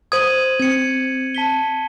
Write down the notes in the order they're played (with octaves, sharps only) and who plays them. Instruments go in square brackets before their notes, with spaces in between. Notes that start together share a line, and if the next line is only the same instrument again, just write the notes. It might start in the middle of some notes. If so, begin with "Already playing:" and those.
[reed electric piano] C5 D#6 [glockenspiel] G#6 D#7 F#7
[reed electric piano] C4 [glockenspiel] G#6 C#7
[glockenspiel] A5 B6 G7